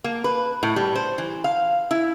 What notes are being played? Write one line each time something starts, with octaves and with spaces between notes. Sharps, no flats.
A#3
B4
A2
G3
C5
E3
F5
E4